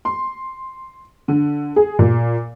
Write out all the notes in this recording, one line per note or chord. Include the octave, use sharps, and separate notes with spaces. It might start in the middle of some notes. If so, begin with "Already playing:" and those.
C6
D3
G#4
A#2